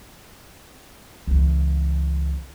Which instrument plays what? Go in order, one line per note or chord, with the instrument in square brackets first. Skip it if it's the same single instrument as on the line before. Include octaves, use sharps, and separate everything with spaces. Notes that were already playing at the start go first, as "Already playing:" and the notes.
[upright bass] C#2 E3